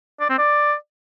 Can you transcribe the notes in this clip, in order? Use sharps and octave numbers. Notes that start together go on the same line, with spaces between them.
D5
C4
D5